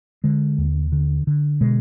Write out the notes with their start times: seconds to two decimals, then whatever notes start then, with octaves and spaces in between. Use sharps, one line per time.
0.24 D3 G#3
0.58 D#2
0.92 D3
1.27 D3
1.61 B2 G#3